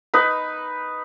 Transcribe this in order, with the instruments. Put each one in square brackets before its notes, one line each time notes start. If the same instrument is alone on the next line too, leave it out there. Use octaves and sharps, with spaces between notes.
[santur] D#4 B4